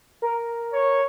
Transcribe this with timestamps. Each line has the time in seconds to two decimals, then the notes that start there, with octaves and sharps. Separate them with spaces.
0.22 A#4
0.73 C#5